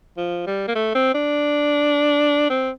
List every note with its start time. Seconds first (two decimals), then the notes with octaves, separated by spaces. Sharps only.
0.17 F3
0.47 G3
0.68 A#3
0.75 A3
0.95 C4
1.14 D4
2.50 C4